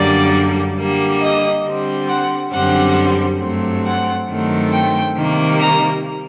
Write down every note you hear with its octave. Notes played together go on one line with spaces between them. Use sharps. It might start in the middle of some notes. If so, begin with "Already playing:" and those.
Already playing: F#2 D3 G3 A#3 D5
D3 G3 A#3
D#5
D3 G3 C4
F#5
F#2 D3 G3 C4 F#5
G2 F#3 A3 C4
F#5
G2 D#3 F#3 A3 C4
G5
C3 D#3 G3 A#3
A#5